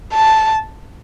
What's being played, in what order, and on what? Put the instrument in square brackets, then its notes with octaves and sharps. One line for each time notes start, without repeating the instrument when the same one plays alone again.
[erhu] A5